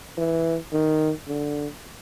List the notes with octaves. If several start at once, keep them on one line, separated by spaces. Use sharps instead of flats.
E3
D#3
D3